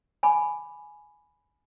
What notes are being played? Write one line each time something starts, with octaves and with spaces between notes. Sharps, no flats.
G#5 B5 D6